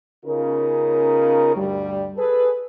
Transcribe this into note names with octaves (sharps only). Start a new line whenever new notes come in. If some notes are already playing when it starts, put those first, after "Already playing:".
C#3 B3 C#4 D#4 F4 A#4
D2 G2 G3
G#4 A4 B4